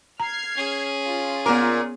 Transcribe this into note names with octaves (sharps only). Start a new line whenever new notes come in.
A#5 F6 G#6 C7
C#4 G#4
F4
A#2 B3 A#4 D6